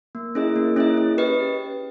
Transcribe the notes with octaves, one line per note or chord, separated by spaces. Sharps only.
A#3
C#4 E4 G#4 D#5
A#3
C#4 E4 G#4 D#5
C#4
G4 B4 D#5